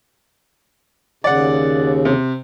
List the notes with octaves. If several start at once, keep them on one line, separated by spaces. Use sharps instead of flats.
D#2 C#3 D5 F#5
C3